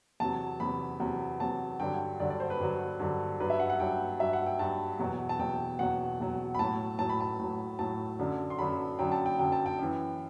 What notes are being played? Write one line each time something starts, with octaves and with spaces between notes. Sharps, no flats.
E2 C3 F#3 A5
E2 C3 F#3 B5
E2 C3 F#3
E2 C3 F#3 A5
G2 D3 F#3 G5
G2 D3 F#3 D5
D5
C5
B4
G2 D3 F#3
G2 D3 F#3
G2 F#3 B4
E5
F#5
F#5
G2 F#3 G5
G2 F#3 E5
F#5
G5
G2 F#3 A5
E2 B2 F#3
A5
E2 B2 F#3 G5
E2 B2 F#3 F#5
E2 B2 F#3
B5
A2 F#3 A5
A2 F#3 A5
B5
A5
A2 F#3
A2 F#3 A5
F#2 D3 F#3
C6
F#2 D3 F#3 B5
F#2 D3 F#3 G5
A5
G5
F#2 D3 F#3 G5
A5
G5
F#2 E3